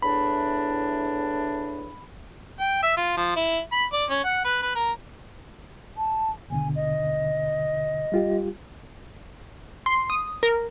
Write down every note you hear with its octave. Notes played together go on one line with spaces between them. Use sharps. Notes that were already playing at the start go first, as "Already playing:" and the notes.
E2 A2 D4 B5
G5
E5
F4
F3
E4
B5
D5
C#4
F#5
B4
B4
A#4
A5
D#2 B2 D3 G#5
D#5
G3 F4 G4
C6
D#6
A#4